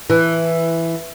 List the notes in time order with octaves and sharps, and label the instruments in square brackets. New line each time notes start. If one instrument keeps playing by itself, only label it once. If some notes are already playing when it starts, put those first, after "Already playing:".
[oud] E3